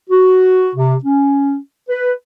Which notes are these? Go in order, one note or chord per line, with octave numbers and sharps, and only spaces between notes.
F#4
C3
C#4
B4